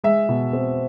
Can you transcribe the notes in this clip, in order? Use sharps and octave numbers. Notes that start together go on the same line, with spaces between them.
G#3 E5
B2
C4